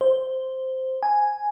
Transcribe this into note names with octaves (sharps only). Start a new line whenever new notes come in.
C5
G#5